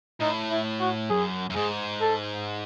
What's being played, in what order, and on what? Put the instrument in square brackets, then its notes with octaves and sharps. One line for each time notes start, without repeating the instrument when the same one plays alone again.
[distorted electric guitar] A2 [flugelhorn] D#4
[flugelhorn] E4
F#4
[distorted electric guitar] F#2 [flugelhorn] G#4
[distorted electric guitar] F#2
[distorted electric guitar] G#2 [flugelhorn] G#4
[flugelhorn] A4